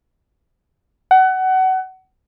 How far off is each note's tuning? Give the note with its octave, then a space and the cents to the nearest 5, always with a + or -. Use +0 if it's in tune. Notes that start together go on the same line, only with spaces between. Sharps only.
F#5 +25